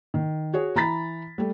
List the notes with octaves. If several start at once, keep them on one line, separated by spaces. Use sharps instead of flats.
D#3
F#4 G#4 C#5
E3 A#5 B5 A6 B6
G3 A3